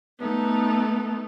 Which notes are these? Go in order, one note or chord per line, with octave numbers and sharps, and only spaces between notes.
A3 B3 D#4 A4